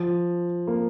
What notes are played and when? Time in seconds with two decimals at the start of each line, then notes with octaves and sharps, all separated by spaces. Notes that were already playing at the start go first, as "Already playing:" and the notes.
Already playing: F3
0.67 A#3